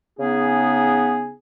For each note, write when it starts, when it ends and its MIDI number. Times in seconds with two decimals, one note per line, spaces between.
0.19 1.32 49
0.19 1.32 59
0.19 1.32 63
0.19 1.32 68